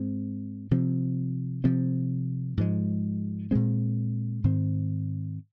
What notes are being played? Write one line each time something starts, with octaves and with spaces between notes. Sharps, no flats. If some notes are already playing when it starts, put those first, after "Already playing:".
Already playing: G#2 G#3 C4
C3 F3 C4
C3 F3 C4
G#2 F3 G#3
A#2 G#3 C4
G#2 D#3 C4